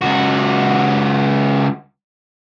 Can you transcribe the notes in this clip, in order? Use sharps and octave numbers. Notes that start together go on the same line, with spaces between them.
C#2 F#4